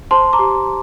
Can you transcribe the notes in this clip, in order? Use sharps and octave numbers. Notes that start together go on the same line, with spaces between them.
C5 A5 C6
A#5 D6
G4